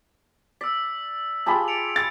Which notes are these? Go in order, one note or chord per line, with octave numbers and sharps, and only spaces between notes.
D5 E6 B6
F4 G4 G#4 A5 B5
C#7 D7 F7
A6